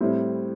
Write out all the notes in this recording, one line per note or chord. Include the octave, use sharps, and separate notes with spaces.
A2 G3 C4 E4